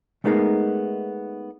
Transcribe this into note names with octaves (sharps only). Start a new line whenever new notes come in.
G#3 A3 B3 D#4 G#4 A#4